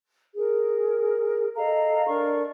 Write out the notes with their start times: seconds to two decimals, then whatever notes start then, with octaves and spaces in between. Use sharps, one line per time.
0.35 G#4 A#4
1.56 A4 D#5 F5 A#5
2.07 D4 A#4 D5 C#6